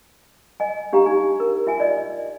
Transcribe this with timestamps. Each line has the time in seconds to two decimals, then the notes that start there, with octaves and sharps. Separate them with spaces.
0.60 D#5 G#5
0.93 D4 G4 F5 A#5
1.05 D#4 G#5
1.40 A#4
1.67 F4 E5 G5 G#5
1.80 D5 D#5